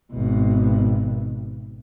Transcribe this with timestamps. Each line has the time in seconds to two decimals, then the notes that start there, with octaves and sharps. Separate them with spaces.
0.12 G#1 B2